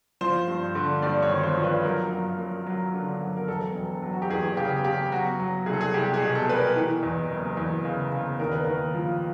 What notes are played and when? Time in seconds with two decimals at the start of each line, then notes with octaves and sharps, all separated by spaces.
0.21 F3 C5
0.48 G2
0.75 D3
1.02 G2 D5
1.22 C#5
1.30 G#1
1.43 C5
1.57 F3
1.63 B4
1.84 F#3 A#4
2.11 F#2
2.39 F#2
2.66 F#3
2.94 D3
3.21 F#3
3.37 A#4
3.48 E1 A4
3.76 E1
4.02 F#3
4.13 F#4
4.22 G4
4.30 E2 G#4
4.57 C#3 G4
4.84 C#3 G4
5.12 F#3 F#4
5.40 F#3
5.66 C2 G#4
5.73 A4
5.81 G#4
5.94 C2 G4
6.14 G#4
6.21 B2
6.35 A4
6.48 B2 B4
6.55 A#4
6.76 E3
7.03 E2
7.30 F#1
7.57 E2
7.85 C#3
8.12 C#3
8.39 D#2 A#4
8.52 B4
8.65 D#2 A#4
8.94 F3